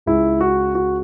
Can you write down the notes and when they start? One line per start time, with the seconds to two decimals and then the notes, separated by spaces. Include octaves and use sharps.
0.06 C#2 C#3 G#3 E4
0.41 F#4
0.75 F#4